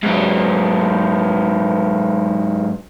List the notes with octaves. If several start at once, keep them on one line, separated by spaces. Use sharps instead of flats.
G#2 F#3